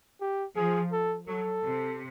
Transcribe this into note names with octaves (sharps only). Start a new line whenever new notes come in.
G4
F3 G#4
A4
F#3 A4
C3